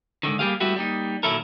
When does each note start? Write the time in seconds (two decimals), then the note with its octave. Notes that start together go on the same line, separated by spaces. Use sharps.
0.23 G#2 B2 D3 D#3
0.39 G3 A#3 G4 G#4 F5
0.60 G3 A3 B3 E4 F#4 G4
0.76 G3 A#3 D#4
1.23 A#2 D#3 F#3 E4 A4 A#4